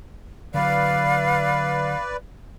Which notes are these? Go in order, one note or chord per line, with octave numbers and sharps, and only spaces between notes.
D3 F#3 B4 D5 F5